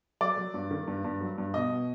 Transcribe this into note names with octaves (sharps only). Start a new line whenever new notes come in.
F#3 D5
F#3
G2
D#3
G2
G2
F#3
G2
B2 D#5
B2